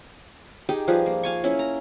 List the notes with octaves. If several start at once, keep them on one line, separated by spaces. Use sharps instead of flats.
D#4 G4 G#4
F3 G3 G#4 B4
A#3
F5 G#5 C#6
A#3 C#4 E4
A#5